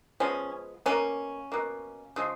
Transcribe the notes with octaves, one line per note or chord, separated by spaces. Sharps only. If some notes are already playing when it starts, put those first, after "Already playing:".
F3 G#3 B3 C#4
B2 A#3 C#4
B2 A#3
C#3 F3 G#3